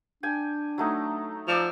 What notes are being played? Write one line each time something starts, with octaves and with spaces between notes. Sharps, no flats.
D4 G5 G#5
F#3 A3 D#4
F3 D5 D6 E6